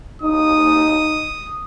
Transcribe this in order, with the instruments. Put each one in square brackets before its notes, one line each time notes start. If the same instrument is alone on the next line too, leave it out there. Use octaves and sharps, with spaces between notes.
[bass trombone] D#4 [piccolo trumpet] D#6